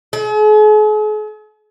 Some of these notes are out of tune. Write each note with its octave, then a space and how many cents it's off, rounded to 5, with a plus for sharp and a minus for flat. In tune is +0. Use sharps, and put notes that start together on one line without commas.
G#4 +45